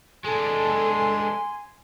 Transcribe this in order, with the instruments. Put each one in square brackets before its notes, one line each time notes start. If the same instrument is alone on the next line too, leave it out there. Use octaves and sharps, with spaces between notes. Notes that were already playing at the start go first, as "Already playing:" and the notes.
[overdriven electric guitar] G#3 D4 [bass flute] A4 [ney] G#5 [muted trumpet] C6